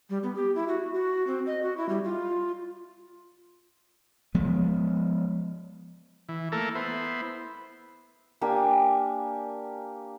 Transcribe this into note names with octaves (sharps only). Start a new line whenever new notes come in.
G3
B3
G4
E4
F#4
F#4
C4
D#5
F#4
E4
G3
F4
F3 G#3 B3
E3
A3 A#3 E4 A4 A#4
B3 E4 C5
A#3 D4 G4 G#5